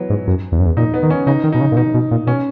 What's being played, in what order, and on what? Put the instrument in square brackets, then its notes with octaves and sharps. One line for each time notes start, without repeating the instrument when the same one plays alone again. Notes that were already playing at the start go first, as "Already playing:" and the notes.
Already playing: [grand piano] E3 F#3 B3
[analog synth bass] G#2
F#2
E2
F#2
E2
[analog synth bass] A#2 [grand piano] D#4
[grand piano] B3
[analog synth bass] D#3
[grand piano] C#4
[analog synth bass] C#3 [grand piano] D#4
[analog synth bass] D#3
[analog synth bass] B2 [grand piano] D#4
[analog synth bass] C#3
A#2
[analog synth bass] B2 [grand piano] D#4
[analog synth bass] B2
A#2
[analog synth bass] B2 [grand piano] C#4